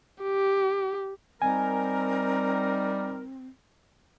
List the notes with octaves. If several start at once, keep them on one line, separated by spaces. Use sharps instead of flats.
G4
G3 C4 D#4 A#4 G#5